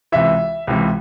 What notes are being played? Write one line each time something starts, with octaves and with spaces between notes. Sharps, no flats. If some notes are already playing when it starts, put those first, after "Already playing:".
C#2 C3 E3 E5
C#2 C3 E3